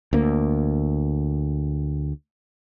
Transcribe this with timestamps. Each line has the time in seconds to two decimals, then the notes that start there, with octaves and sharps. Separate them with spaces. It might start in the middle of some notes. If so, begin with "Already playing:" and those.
0.13 D2 A#3